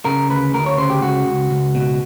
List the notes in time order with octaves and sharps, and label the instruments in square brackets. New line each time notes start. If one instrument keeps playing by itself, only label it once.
[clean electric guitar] C#3 A#4
D2 B4
D2 A#4
C#5
C#3 C5
G4
C#2 F#4
C#2
C#2
B2